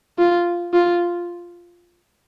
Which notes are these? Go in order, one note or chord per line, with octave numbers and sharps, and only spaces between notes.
F4
F4